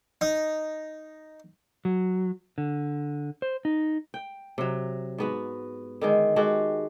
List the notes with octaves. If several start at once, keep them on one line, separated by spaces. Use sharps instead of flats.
D#4
F#3
D3
C5
D#4
G5
C3 F#3
G#2 B3 F#4
D3 D#3 G#3
G#3 F#4 G4 A4